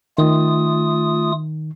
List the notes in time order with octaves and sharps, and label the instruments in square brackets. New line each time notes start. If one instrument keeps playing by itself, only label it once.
[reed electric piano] D#3 [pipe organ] A3 F4 D#6